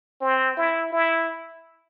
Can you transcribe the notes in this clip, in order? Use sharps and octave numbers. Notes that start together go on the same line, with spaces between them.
C4
E4
E4